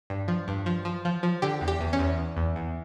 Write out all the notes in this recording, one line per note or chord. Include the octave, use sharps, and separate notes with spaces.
G2
F3
G2
F3
F3
F3
F3
D3 G4
E2
G4
E2
C#4
E2
E2
E2
E2